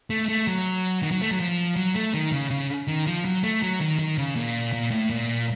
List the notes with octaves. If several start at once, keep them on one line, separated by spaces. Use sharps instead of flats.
A3
A3
F#3
D#3
F#3
A3
F#3
F3
F#3
A3
D#3
C#3
C#3
D#3
F3
F#3
A3
F#3
D#3
D#3
C#3
A#2
A#2
A2
A#2